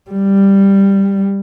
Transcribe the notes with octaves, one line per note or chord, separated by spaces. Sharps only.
G3